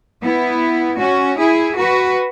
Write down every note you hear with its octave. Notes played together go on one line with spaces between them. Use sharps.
B3 E4
C#4 F#4
E4 G#4
F#4 B4